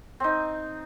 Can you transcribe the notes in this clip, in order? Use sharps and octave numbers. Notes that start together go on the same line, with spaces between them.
C4 D#4